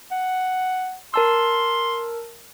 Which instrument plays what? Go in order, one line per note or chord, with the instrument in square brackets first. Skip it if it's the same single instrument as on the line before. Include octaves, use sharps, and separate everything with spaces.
[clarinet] F#5
[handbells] A#4 A5 E6 [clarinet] C6